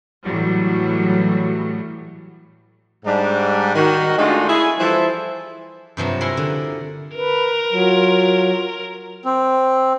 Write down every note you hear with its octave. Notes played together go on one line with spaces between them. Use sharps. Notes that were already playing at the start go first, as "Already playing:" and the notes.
A2 E3 F#3 G3
G#2 G3 D4
D#3 F#4
G#3 A3 D4 D#4 F4 F#4
E4 G#4
E3 F3 G3 E4 A4 C5
G2 C3 F3 F#3
E4 A#4 F#5 G#5 A#5 C6
D3
A#4 B4
F#3 F4
C4